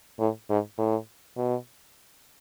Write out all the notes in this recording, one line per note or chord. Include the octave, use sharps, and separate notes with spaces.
A2
G#2
A2
B2